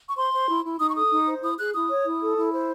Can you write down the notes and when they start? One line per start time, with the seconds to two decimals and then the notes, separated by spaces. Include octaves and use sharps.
0.08 C#6
0.16 C5 C6
0.33 C5
0.48 E4
0.64 E4
0.79 D#4 D#6
0.88 C#6
0.95 A4 D#6
1.11 D#4
1.27 C5
1.43 E4 D#6
1.58 G#4 F#6
1.74 E4 D#6
1.90 C#5
2.06 E4
2.22 A4
2.37 E4
2.53 C5